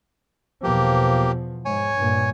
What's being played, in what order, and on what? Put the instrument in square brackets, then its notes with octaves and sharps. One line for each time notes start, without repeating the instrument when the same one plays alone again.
[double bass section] E2 B2 F3 [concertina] A#3 G4
[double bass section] G#2 [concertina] C#5 G#5
[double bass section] G2 A#2